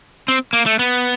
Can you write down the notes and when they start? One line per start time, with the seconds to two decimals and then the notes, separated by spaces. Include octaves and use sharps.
0.28 C4
0.53 A#3
0.66 A3
0.79 B3